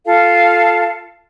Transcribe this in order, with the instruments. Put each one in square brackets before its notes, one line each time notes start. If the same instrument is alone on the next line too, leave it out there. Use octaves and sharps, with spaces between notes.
[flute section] F4 A4 F5